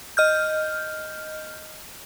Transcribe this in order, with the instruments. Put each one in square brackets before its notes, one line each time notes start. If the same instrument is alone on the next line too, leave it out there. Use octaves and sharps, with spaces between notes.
[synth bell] D#5 F6 G6